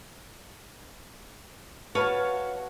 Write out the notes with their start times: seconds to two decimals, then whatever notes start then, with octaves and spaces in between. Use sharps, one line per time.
1.95 F#4 B4 C#5 F5 A5